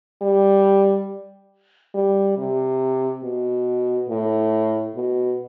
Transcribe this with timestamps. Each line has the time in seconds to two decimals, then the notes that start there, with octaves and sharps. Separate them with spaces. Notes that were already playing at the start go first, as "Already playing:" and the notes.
0.22 G3
1.94 G3
2.37 C3
3.23 B2
4.09 A2
4.95 B2